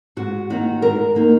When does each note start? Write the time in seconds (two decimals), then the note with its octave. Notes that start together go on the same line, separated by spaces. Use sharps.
0.16 G#2 F#4
0.50 D#3 A#3 D#4 F#4
0.82 G#2 A#4
1.15 D#3 A#3 D#4